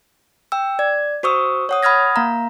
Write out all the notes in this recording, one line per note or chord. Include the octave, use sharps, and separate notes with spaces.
G5 E6
D5 G#6
F#4 C5 C#6 D#6 E6
C#5 F#5 D#6
F#5 B5 D#6 F6 G#6 A#6
A#3 F5 A#5